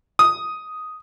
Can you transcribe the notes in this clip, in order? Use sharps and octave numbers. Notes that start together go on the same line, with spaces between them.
D#6